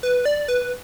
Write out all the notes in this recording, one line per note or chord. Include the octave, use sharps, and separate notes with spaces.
B4
D5
B4